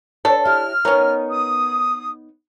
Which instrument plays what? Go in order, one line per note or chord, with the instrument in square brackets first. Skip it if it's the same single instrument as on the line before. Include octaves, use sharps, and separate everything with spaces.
[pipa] D4 A4 [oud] B4 C#5
[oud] E4 G4 [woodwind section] F6
[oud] B3 D#4 C#5 [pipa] C#4 A#4
[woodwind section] D#6